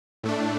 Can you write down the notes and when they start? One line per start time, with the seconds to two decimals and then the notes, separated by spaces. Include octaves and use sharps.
0.23 A2 A3 D4